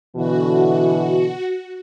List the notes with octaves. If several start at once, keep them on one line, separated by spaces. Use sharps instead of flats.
B2 D3 E3 F#4